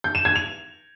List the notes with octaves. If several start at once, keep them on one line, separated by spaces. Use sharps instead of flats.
G6
E7
G#6
F7